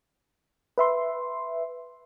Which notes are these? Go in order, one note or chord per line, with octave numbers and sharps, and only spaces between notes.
B4 E5 C6